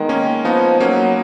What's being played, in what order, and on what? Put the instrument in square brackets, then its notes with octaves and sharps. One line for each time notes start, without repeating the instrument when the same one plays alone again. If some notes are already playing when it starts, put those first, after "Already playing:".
Already playing: [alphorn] D#3 [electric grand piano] G#3 B3
[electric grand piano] A#3 C#4
[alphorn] F3 [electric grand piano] B3 D#4
[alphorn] F#3 [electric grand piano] A#3 C#4